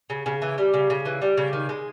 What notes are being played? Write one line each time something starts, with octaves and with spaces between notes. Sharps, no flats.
C#3
C#3
E3
G3
C#3
C#3
E3
G3
C#3
D#3
G#3